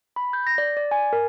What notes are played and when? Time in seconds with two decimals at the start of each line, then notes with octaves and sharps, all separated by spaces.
0.16 B5
0.33 G6
0.47 A#6
0.58 D5
0.77 D5
0.91 G#5
1.13 A#4